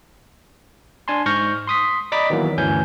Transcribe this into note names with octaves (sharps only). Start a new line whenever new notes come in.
D4 G#5 A5 C6
G#2 C#6 F6 G6 A#6
C6 D#6 B6
D5 D#5 A#5 B5 D6 B6
D#3 E3 F#3 A#3 B3
G1 D2 E3 C#4 G#5 G6